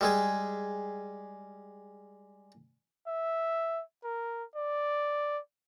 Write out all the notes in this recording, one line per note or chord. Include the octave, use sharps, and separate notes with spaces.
G3 G#3 G#4
E5
A#4
D5